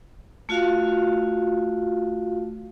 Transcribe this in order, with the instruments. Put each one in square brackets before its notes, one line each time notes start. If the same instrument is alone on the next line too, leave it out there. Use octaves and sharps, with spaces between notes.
[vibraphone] A3 F4 F#4 F5